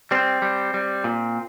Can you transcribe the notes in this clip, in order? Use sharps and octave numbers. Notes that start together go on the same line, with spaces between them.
G3 C4
G3
G3
A#2